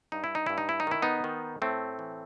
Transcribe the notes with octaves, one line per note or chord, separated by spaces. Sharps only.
G2 D#4
E4
D#4
G2 E4
D#4
E4
D#4
D#3 E4
B3 D#4
D#3
A2 A3 C4
E3